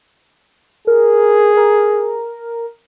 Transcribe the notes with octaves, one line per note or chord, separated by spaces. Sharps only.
G#4 A#4
A#4